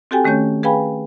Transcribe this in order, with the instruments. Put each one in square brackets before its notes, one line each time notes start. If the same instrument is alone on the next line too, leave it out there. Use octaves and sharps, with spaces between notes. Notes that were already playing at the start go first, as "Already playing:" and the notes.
[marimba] C4 F#4 G4 A4 G5 G#5
D#3 A3 C#4 C#5 G6
G#4 B4 F5 G5 G#5 B5